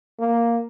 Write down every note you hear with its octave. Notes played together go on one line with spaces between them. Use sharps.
A#3